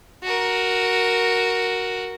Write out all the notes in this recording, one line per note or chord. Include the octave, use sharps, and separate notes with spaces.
F#4 A#4